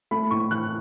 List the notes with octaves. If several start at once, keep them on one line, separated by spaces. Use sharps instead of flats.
A3 B5
A2 C#6
E3 F#6